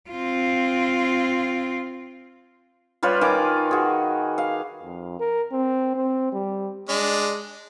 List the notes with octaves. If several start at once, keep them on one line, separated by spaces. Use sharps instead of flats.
C4 F4
G3 F4 B4 C#5
D#3 G#5 D6
F#4 G#4
F5
F2
A#4
C4
C4
G3
G#3 D4